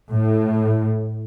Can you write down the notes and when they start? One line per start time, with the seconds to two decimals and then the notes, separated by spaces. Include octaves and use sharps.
0.12 A2